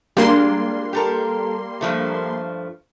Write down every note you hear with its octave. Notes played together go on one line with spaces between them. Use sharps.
G3 G#3 A#3 D4 F4 C6
G4 A4 A#4
G2 F3 A3